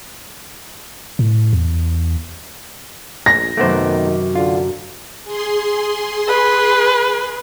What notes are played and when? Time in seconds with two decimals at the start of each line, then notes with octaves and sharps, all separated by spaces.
1.19 A2
1.53 E2
3.26 A#1 A#6
3.57 F#2 C3 D#3 A3 B3 C5 D6
4.35 D3 F4
5.24 G#4 C6
6.27 B4